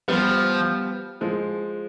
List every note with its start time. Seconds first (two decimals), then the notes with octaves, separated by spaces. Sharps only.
0.08 F3 G3 B3
1.21 F3 G#3